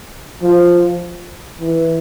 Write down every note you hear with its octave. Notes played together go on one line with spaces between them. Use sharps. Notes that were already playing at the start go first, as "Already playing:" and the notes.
F3
E3